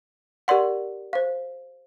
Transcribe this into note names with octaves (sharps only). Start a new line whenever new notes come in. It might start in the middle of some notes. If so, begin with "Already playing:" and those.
G4 A#4 D5 F#5 C6
C5 F5